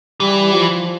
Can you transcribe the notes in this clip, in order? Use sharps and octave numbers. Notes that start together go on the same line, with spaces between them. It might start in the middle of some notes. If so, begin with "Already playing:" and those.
E3 G3
F3